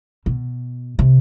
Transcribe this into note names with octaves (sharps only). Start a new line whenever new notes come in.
B2
C3